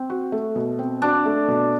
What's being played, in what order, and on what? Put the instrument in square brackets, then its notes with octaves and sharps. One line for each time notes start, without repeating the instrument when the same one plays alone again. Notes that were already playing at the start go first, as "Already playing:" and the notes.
Already playing: [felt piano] C4
F#4
A3
B2
C4
[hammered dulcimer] D4 [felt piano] F#4
[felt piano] A3
B2